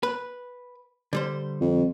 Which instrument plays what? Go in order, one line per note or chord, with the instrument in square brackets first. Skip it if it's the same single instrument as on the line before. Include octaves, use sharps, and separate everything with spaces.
[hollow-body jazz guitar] B4
D3 G3 C5
[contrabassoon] F2